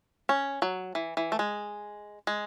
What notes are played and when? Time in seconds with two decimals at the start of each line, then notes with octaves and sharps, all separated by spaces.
0.29 C#4
0.62 F#3
0.95 E3
1.17 E3
1.32 A3
1.39 G#3
2.27 G#3